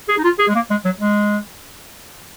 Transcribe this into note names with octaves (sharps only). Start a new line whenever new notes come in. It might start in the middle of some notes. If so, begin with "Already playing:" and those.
G#4
D#4
F4
G#4
G#3
A#3
G#3
F#3
G#3